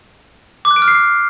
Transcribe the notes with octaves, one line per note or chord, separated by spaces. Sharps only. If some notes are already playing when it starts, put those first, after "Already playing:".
D6
F#6
D7
F6
C7